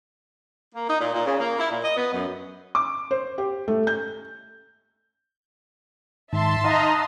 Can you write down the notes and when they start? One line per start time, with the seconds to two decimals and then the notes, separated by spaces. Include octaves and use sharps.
0.74 A#3
0.88 D#4
1.01 A#2
1.13 A#2
1.26 C#3
1.39 A#3
1.58 E4
1.70 A#2
1.83 D#5
1.97 B3
2.12 F#2
2.75 D6
3.11 C5
3.38 G4
3.68 A3
3.87 G6
6.33 G#2 D#3 E5 A5 C6
6.64 D#4 D#5 F5 F#5 A#5 D#6